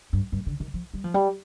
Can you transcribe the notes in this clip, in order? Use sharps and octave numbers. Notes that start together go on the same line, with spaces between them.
G2
G2
D3
D#3
F3
G3
F3
G3